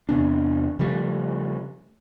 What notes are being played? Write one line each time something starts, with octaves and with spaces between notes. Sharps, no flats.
E2 C3 B3 D4
C#3 F3 G3 A3